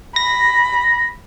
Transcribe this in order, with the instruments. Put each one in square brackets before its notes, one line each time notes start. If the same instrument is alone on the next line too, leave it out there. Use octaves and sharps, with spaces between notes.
[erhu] B5 [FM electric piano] A#6